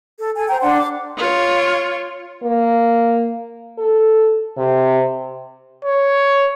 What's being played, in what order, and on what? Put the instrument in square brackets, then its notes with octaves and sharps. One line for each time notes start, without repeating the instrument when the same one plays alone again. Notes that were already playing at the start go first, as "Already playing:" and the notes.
[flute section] A4
A4 G#5
C5 G5 A#5
D4 D5 F#5 C6
D6
[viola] F4 C#5
[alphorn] A#3
A4
C3
[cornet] C#5